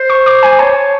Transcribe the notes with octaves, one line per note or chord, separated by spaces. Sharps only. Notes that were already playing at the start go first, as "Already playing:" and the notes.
Already playing: C5
C#6
D6
G#5
C#5 A5